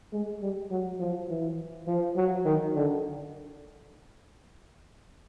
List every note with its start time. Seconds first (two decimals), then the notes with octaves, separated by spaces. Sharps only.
0.13 G#3
0.41 G3
0.71 F#3
1.00 F3
1.29 E3
1.87 F3
2.17 F#3
2.46 D#3
2.75 D3